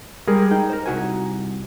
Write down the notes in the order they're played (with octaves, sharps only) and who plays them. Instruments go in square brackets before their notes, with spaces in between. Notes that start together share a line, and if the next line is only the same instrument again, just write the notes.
[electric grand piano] G3 G#4 A#4 [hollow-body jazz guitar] G#3
[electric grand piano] D#4 [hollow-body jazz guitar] G5
[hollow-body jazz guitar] A#4 C5
C2 F#4 G#5